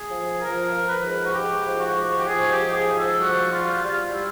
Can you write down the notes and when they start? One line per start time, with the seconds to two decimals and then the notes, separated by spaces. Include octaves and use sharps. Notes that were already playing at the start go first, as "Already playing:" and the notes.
Already playing: G#4
0.10 F3
0.40 F3 A#4
0.72 F3
0.87 B4
1.03 G#2
1.26 F#4
1.34 G#2 G4
1.65 F3
1.81 F#4
1.96 G#2
2.17 G4
2.27 F3 G#4
2.50 G4
2.59 G#2
2.73 G#4
2.89 F3
2.97 A4
3.20 G3 F#4
3.51 G3 F4
3.82 G3 F4
4.13 G3 E4